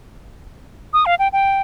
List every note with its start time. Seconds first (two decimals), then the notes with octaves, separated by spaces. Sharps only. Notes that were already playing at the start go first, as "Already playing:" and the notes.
0.93 D#6
1.06 F5
1.19 G5
1.33 G5